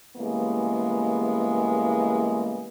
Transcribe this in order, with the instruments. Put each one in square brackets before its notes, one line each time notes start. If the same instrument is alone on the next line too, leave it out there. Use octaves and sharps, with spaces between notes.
[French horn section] C#3 E3 G3 G#3 A#3 B3